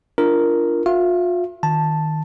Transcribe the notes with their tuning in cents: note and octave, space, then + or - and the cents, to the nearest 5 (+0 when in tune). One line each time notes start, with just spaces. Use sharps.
D4 +0 F4 -25 A#4 +0
F4 +40 E5 +40
D#3 +0 A5 +0